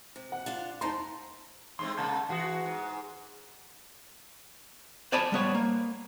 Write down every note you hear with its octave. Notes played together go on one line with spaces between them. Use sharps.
C3
F#5
D4 F4 F5
D#4 E4 C5 A5 A#5 C6
G2 G#3 C4 C6
C3 G#3 A#3 F#5 A5 G6
E3 F#4 G#4 F#5
G#2
C5 D5 G#5 A5 B5
G3 B3 C#5
A#3